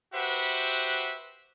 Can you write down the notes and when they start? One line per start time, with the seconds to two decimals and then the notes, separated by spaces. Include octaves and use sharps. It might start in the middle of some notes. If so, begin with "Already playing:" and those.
0.14 F#4 G4 B4 C5 E5 F#5